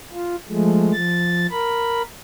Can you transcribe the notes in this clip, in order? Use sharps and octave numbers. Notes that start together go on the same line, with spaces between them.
F4
F3 G#3 A3
F3 A6
A#4 B5